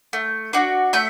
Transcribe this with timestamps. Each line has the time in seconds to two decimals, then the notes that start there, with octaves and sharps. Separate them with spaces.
0.13 A3
0.53 D4 F#4
0.93 A3 E5